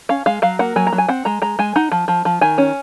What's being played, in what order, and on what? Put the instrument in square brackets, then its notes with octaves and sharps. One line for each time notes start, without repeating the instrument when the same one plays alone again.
[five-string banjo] C#4 F5
G#3 F5
F#3 F5
A#3 F#5
F#3 G#5
A#5
F#3
G#5
C4 F#5
G#3 A#5
G#3 A#5
G#3 G#5
D#4 F#5
F3
F3
F3
D#3 G#5
C#4